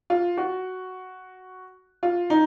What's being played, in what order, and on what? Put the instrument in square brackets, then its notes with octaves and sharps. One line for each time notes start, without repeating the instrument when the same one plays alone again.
[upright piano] F4
F#4
F4
D#4